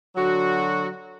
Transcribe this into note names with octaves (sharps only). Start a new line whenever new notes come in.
D3 F#3 F#4